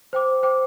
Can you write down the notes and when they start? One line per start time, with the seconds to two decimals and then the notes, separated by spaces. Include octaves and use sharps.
0.13 C5 G5 D6
0.43 C5 G5 D6